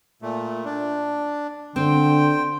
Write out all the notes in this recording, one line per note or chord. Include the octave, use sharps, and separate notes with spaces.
A#2 A3
D4
D3 C4 G5 C6